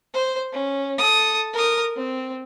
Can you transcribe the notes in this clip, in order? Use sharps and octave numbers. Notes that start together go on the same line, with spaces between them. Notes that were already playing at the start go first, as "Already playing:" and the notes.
C5
C#4
A4 D#6
A#4 D#6
C4